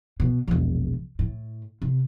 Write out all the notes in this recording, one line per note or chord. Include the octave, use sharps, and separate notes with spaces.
B2
E1 A#1
A2
C3